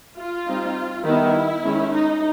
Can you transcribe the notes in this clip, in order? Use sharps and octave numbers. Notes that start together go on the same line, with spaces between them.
F4
G3 C4 D#4
D#3 G3 B3 E4
D#3 G#3 C#4
D#4